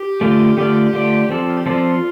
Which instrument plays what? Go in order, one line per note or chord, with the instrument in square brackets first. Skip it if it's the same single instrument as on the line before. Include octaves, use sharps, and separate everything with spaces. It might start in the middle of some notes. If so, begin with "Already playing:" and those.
Already playing: [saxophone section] G4
[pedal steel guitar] D3 A3 F4 D5
[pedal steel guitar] D3 A3 F4 D5 [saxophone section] G4
[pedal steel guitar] D3 A3 F4 D5
[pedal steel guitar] F3 C4 A4 D5 [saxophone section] F4
[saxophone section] F4
G4
[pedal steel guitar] F3 C4 A4 D5 [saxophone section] F4